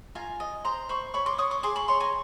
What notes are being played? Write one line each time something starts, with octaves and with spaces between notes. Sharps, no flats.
F4 G#5 A#5
D#5
C5 A#5 C6
C5 B5 C#6
C#5 B5 C#6
C6 D6
C#5 C#6 D#6
C6 D6
G#4 C6 D6
B5 C#6
C#5 A#5 C6
G#5 A#5